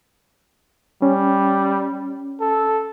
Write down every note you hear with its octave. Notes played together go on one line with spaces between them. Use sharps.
G3 C#4
A4